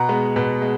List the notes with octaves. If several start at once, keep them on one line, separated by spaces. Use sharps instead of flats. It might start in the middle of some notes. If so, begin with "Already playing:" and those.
Already playing: B2 F#5 A#5
G#3 B3
B2
G#3